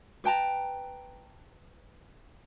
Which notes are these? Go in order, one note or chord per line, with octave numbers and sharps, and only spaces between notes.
B4 G5 A5 A#5